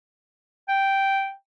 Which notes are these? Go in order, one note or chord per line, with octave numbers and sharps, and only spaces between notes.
G5